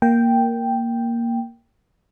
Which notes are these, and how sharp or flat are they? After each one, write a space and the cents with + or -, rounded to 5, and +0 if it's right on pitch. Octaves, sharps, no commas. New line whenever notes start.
A#3 +0 G5 +0